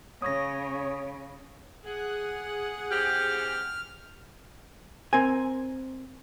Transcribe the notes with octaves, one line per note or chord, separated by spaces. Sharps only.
C#3 C#5 D#6 A#6
G#4 F#5
E3 C4 G4 F6
C4 A#4 G#5